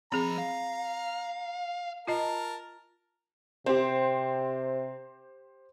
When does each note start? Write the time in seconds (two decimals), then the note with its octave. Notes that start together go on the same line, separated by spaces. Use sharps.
0.12 F3 C4 G#4 A#5 B5
0.38 F5
2.07 F4 A#4 D#5 A5
3.66 C3 C4 G4 C5